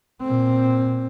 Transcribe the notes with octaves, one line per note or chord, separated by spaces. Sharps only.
A#2 C4